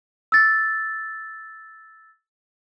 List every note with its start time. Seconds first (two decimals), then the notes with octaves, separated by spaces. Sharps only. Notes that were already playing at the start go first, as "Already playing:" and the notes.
0.32 E6 A6